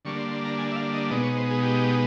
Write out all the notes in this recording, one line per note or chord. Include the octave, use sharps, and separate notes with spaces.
D3 G3 A#3 D4 C#6
C6
C6
A#5
G#5
E5
F5
D#5
B2 G#3 B3 D#4 D5
C#5
C5
G#4
G4